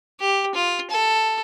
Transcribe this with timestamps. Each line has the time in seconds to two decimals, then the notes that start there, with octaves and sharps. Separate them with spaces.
0.20 G4
0.55 F4
0.90 A4